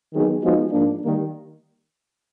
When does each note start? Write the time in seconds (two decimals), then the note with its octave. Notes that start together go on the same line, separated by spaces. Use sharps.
0.12 D#3 F#3 B3 D#4 G#4
0.42 F3 G#3 B3 D#4 F#4
0.72 G#2 F3 A#3 D4
1.02 D#3 G3 A#3